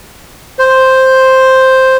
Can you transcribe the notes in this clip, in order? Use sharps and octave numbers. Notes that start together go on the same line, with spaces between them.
C5